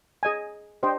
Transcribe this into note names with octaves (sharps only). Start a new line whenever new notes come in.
G#4 D#5 G#5
D4 G4 C5 D#5 G5